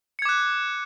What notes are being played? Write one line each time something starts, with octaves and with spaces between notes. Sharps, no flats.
D6 F#6 G#6 C#7